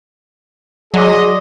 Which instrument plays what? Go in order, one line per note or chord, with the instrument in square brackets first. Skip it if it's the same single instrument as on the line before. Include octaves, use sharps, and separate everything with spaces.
[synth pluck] F#3 [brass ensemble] G#4 D#5 [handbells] D5 C6 D6